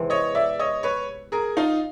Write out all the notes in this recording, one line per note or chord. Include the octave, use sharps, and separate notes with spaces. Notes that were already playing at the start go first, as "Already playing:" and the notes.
Already playing: E2 C3 E3 G#3 C4
C#5 D#5
D5 E5
C#5 D#5
B4 C#5
G#4 A#4
D#4 F4